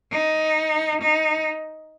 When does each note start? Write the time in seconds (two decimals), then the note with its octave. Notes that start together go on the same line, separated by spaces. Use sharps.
0.12 D#4
1.02 D#4